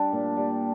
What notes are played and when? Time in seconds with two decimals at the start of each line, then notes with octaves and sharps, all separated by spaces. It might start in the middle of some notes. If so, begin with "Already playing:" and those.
Already playing: G3 D4
0.13 A#2
0.37 G3